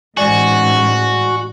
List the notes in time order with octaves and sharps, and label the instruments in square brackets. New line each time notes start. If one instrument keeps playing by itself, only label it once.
[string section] A1 G#2 [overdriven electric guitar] F#4 [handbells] D5 G#5